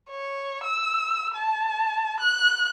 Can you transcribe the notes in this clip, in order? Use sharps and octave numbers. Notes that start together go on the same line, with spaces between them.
C#5
E6
A5
F#6